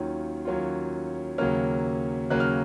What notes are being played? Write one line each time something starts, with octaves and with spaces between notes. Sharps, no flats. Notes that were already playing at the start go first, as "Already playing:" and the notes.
Already playing: D#2 D#3 F#3 C#4 F4
D#2 D#3 F#3 C#4 F4
D#2 C#3 F#3 A#3 C#4 F6
D#2 C#3 F#3 A#3 C#4 F#6
F6